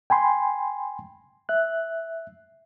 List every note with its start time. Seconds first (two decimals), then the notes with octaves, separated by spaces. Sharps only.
0.10 G5 G#5 B5 C6
1.49 E5 F#6